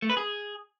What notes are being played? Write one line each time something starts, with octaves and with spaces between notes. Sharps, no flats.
A3
B4
G#4